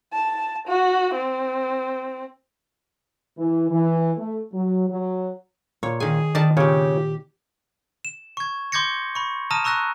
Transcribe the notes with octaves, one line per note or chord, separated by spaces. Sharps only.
A5
F#4
C4
E3
E3
A3
F#3
F#3
A#2 C#5
D#3 G#4 G#5
D#3 D5 D#5 A5
A#2 C#3 C4 G4 C#5 G5
E7
C#6 G#6
C6 D6 G6 G#6 A#6 C#7
B5 C#6
A5 A#5 D#6 F6 A#6 D#7
A#5 C#6 E6 F#6 A#6